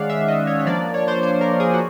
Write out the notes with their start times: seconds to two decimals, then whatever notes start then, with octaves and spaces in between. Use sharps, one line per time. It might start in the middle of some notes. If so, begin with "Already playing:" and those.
Already playing: D#3 G#3 C#4 D5 F5 F#5
0.10 E5
0.28 D#5
0.47 C#5
0.59 C#5
0.66 F3 A#3 D4 D5
0.94 C#5
1.08 C5
1.23 C5
1.41 A#4
1.60 G#4
1.73 F#4